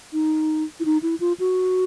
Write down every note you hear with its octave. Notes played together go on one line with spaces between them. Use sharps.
D#4
E4
D#4
E4
F4
F#4